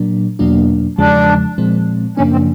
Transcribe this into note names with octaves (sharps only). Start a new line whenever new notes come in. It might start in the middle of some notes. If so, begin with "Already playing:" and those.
Already playing: A#2 F#3 A#3 D4
E2 B2 F#3 A#3 D4
E2 C#3 F3 G#3 D4
A#2 F3 G#3 C4
F#2 C#3 F3 A#3 C#4 D4
C4